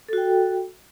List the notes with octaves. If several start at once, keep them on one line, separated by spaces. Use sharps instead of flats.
F#4 A4 G5